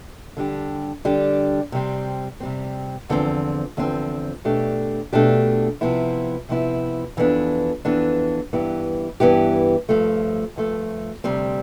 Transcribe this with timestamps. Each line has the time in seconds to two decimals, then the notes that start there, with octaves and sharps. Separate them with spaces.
0.37 D3 G3 D4 G4
1.05 D3 G3 D4 G4
1.72 C3 G3 C4
2.40 C3 G3 C4
3.09 E2 D3 F3 C4
3.77 E2 D3 F3 C4
4.45 B2 A3 D4 G4
5.13 B2 A3 D4 G4
5.81 C3 F3 B3 E4
6.49 C3 F3 B3 E4
7.17 F2 E3 B3 D4
7.85 F2 E3 B3 D4
8.53 G2 E3 B3 E4 G4
9.20 G2 E3 B3 E4 G4
9.89 G2 F3 A3
10.56 G2 F3 A3
11.24 D2 C3 G3 C4